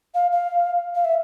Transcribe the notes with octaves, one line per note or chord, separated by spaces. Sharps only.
F5
F5
F5
E5